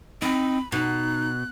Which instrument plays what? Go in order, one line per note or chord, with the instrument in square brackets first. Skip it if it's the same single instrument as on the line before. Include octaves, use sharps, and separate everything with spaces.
[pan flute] C4 [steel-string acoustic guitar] D#4 [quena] B5
[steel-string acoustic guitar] B2 [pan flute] D#4 [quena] F#6